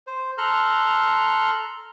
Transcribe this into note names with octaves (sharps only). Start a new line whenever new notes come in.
C5
A4 A#5 C6 F6 F#6